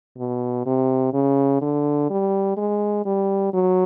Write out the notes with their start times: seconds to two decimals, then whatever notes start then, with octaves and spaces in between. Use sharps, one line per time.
0.18 B2
0.66 C3
1.13 C#3
1.62 D3
2.10 G3
2.57 G#3
3.06 G3
3.53 F#3